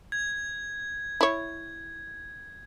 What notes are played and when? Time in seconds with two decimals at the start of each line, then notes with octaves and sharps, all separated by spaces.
0.12 G#6
1.21 E4 C#5